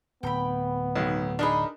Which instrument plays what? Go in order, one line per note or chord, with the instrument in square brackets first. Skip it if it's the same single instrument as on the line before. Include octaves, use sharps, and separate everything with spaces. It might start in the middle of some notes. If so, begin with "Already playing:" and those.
[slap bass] D1 [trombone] B3 [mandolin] G5 B5
[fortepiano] B1 D#3
[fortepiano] D4 D#4 G#4 [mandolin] A#4 D#5 B5